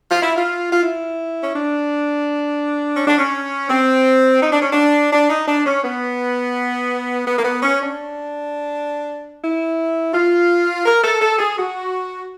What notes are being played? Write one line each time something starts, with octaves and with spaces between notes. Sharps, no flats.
F4
E4
F4
F4
E4
C#4
D4
C#4
D4
C#4
C4
D#4
D4
C#4
D4
D4
D#4
D4
C#4
B3
B3
A#3
B3
C#4
D4
E4
F4
A#4
A4
A4
G#4
F#4